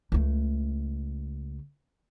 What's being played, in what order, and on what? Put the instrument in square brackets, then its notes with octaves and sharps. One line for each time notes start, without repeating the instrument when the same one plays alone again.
[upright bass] C#2 A3